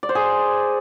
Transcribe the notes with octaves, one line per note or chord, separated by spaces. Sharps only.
D5
C5
G#4